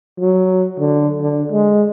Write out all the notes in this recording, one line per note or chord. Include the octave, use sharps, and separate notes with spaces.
F#3
D3
D3
G#3